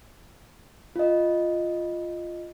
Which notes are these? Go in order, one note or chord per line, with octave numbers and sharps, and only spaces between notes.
F4 D#5